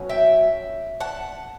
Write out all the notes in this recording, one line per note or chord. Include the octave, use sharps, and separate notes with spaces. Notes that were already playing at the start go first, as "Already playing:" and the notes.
Already playing: B2 F#3 C#4
E5 G5
F#5 A5